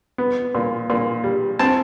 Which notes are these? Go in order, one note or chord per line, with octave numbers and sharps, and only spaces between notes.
B3
A#2
A#2
G3
C4 A5